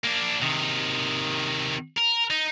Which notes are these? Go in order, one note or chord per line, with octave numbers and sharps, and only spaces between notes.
A#3 D4
C3 D#3
A#4
D#4